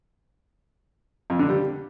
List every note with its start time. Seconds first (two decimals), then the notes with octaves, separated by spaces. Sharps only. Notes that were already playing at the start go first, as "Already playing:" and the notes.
1.30 F2
1.39 D3
1.49 G3